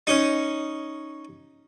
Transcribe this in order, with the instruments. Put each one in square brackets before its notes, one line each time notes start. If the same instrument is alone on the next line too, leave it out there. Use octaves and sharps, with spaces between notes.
[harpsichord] C#4 D#4